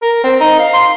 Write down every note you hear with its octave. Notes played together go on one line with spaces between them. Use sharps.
A#4
C4
D#4
F5
C6